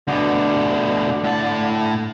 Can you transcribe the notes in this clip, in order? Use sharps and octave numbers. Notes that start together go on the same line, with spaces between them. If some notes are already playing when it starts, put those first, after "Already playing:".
D2 B2 D3
A2 A5